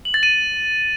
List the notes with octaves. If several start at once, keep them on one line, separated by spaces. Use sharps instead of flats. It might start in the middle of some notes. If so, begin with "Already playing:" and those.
F#7
A6
D#7